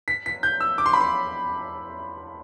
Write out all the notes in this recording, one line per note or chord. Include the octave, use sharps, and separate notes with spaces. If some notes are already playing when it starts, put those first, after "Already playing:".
B6
B6
G6
E6
D6
C6
B5
C6